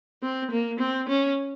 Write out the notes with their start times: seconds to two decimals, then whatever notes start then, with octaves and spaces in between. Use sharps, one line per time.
0.22 C4
0.51 A#3
0.80 C4
1.09 C#4